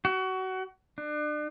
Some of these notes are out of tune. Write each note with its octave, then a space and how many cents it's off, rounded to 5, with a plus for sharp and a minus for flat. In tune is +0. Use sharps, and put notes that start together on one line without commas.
F#4 +25
D4 +35